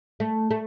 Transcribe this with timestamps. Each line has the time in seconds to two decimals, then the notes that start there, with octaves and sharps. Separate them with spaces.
0.20 A3
0.51 A3